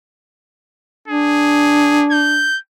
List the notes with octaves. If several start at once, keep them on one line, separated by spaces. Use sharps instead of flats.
D4 G#4
G6